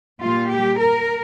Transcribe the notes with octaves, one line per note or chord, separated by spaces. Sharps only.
A#2 G3 F4
G4
A#4